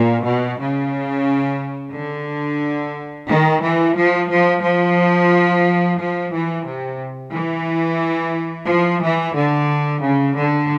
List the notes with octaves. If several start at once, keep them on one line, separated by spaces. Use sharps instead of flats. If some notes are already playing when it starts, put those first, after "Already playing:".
Already playing: A#2
B2
C#3
D3
D#3
E3
F3
F3
F3
F3
E3
C3
E3
F3
E3
D3
C#3
D3